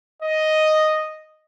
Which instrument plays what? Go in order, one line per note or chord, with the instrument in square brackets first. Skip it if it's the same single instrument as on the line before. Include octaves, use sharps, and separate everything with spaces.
[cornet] D#5